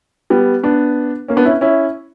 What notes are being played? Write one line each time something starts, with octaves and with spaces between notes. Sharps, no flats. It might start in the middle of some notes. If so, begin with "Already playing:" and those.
G3 B3
B3 D4
A#3 C#4
B3 D4
C#4 E4
C#4 E4